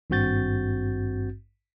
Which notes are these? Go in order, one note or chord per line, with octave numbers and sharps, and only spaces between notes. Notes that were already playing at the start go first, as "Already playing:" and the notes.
G#1 G2 C4 F#4 G6 A6